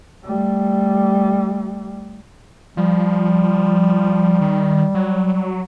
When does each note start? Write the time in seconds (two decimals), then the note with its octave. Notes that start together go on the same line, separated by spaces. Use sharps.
0.24 G3 A3
2.77 F3 G3
4.41 D#3
4.95 F#3